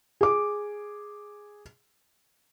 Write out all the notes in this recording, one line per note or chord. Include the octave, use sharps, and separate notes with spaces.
G#4 D6